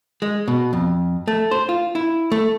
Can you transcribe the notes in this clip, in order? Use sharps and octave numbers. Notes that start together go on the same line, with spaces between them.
G#3
B2
F2
A3
C5
F4
E4
A3